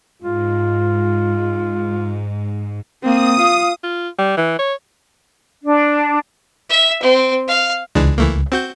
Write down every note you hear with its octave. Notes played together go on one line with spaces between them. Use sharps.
G#2 F4
A#3 C4 D#6
F4 F5
F4
G3
E3
C#5
D4
E5
C4
F5
C#2 E3 G#3 D4
E3 A3 A#3
C4 F#4 G6